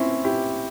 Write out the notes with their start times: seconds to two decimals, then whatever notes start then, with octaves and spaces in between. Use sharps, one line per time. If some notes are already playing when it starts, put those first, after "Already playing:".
Already playing: C4 C#4 E4
0.24 E4 G4